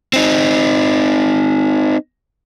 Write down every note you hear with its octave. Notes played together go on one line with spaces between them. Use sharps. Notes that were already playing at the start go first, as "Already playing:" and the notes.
C4 D#4